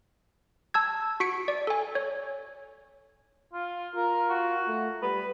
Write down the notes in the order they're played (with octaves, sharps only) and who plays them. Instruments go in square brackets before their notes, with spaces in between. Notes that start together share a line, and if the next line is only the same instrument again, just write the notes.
[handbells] A5 E6 G#6
F#4 B6 C#7 D7
D5
A4 G#5
C#5
[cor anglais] F4
[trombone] F4 [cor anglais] A#4
[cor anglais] F#4
[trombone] A3
[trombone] G3 [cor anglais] B4